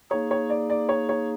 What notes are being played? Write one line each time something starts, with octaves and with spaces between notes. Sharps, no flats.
A#3 D#4 G#4 C#5
C#5
D5
D5
C#5
C#5